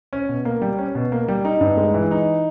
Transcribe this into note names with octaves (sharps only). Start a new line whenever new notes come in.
C#4
B2
A#3
G3
C#4
B2
A#3
G3
D#4
G2
G#3
E3
D#4